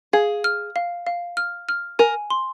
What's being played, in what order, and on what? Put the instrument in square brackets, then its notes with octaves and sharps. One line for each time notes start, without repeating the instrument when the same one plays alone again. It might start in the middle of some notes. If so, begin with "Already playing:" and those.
[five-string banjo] G#4 [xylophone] F5
[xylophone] F6
F5
F5
F6
F6
[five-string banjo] A#4 [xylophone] G#5
[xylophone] C6